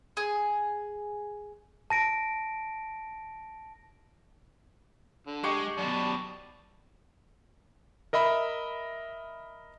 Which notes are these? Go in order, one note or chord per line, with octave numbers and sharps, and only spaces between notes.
G#4
A5 A#6 D7
D3
G#3 G4 G5 C#6
F#2 B2 D5 A5
A#4 D#5 E5 B5